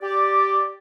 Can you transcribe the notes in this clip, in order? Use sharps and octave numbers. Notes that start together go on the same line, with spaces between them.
G4 D5